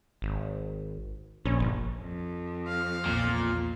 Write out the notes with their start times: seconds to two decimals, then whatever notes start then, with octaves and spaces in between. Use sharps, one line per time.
0.22 G#1
1.45 A#1 C#4
1.60 G1
2.01 F2
2.67 F5
3.06 A#1 E2 A#2